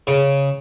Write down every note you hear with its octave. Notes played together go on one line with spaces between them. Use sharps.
C#3